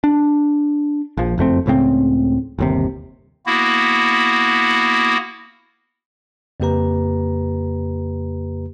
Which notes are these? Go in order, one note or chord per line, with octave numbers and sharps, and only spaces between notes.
D4
A#1 F3
F#1 F2 A3 C4
C#2 A2 C#3 C4
G1 D#2 C3
A#3 B3 E4 F#4
F2 C#3 A#3 G4 B4 A#5